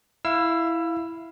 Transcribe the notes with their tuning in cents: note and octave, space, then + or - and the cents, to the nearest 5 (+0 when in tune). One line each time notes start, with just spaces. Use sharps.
E4 +0 F5 +0 E6 +25